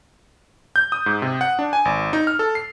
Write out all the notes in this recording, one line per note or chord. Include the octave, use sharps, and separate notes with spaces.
G6
D#6
G#2
C3
F#5
D4
G#5
G#1
D#4
F6
A4
C7